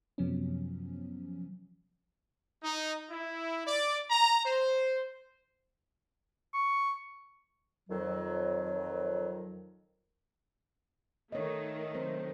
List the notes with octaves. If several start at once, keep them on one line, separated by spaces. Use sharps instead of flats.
F#2 C3 F3 F#3 B3 C#4
D#4
E4
D5
A#5
C5
C#6
F2 D#3 F#3
D#3 A3 C#5 D#5
F#3 C4 C5